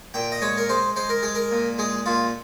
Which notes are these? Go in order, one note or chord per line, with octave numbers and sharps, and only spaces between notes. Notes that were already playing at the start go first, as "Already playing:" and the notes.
A#2 G5
D#5
G#3 C#5
A#4
G#3 C5
G#3 C5
A#4
G#3 G#4
A#4
A#2
G#3 G#4
A#2 F4